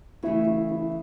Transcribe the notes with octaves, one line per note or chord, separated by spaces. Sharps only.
C#3 E3 A3 E4
E4
E4